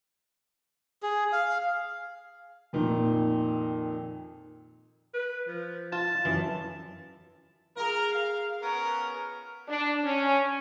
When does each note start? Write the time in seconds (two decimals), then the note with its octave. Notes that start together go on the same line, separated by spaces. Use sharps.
1.03 G#4
1.32 F5
2.73 F2 A#2 D#3
5.14 B4
5.48 F3
5.93 F4 A5
6.25 F#2 E3
7.76 F4 G#4 A#4
8.12 F5
8.62 B3 C#4 A#4
9.67 D4
10.04 C#4